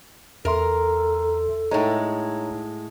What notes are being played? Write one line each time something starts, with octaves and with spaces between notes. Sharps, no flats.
E2 A4 A#4 E5 C6
A2 G#3 D#4 C#5 A#5